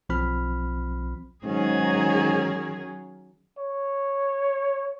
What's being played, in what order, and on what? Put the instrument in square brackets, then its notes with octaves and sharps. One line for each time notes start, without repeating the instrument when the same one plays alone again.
[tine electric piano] B1 F3 C4 B5 F6
[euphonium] G#2 [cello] D#3 G#4 [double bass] F#3 C#4
[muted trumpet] C#5